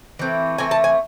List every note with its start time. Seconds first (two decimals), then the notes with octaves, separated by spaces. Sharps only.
0.19 E3 A3 C4
0.58 E3 A3 C4 G#5
0.71 A5
0.84 G#5